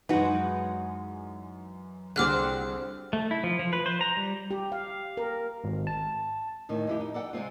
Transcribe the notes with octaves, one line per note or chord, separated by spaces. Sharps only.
F#2 E3 G#3 D#4 F#4 B4
C2 D3 C4 F#4 G#4 D6 F6 F#6
A3
E4
F3
F3
B4
C5
A#5
G3
G4
F5
A#4
G#1
A5
D2 A2 D#3
F2 E4 G4
D#4
A4 D5 F#5 G5
C3 G#3 C4 F4